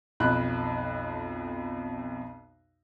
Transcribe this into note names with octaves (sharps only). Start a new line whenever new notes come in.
B1 F2 B5 F#6